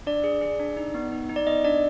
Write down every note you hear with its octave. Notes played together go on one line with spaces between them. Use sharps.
D4 D5
G#4
G#4
D4
D#4
B3
D#4
D#4
D5
B3 D#5
D4 D5